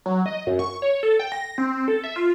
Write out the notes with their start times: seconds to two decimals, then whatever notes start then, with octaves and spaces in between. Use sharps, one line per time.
0.06 F#3
0.26 D#5
0.47 F#2
0.59 C#6
0.82 C#5
1.03 A4
1.19 G5
1.32 A#6
1.58 C4
1.88 A4
2.04 E5
2.16 F4